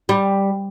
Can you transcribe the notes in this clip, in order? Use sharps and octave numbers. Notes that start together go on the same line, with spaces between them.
G3